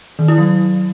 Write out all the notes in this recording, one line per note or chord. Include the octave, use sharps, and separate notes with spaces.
D#3
E4
F#3